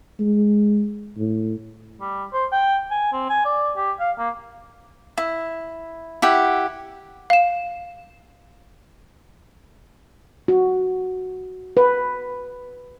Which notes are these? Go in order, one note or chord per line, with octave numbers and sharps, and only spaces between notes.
G#3
A2
G3
C5
G5
G#5
C4
G#5
D5
G4
F5
A#3
E4
E4 G4 F#5
F5 E7
F#4
B4